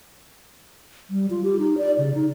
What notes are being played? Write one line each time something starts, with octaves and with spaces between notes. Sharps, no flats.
G3
F4
G4
D#4
D5
C#3
D#4